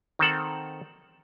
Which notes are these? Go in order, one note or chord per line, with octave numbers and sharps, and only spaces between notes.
D#3 C4 A4 F#5